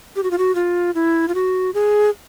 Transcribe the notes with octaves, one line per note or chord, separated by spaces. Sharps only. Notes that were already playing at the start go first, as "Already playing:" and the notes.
G4
F#4
F4
F#4
F4
E4
F4
F#4
G#4